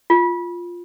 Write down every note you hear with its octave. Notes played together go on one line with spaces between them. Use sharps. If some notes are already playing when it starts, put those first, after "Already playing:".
F4